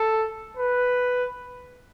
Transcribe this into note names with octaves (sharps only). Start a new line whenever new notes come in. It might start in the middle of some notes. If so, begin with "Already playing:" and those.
Already playing: A4
B4